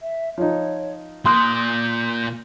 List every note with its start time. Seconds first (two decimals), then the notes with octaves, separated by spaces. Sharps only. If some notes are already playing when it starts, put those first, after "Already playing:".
0.01 E5
0.38 F3 D#4 C#5
1.26 A#2 C6 D#6 F#6 G6